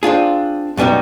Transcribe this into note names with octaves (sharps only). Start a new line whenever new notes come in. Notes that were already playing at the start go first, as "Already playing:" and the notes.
C4 D4 F4 G#4
F#2 B2 G3 B3 D#4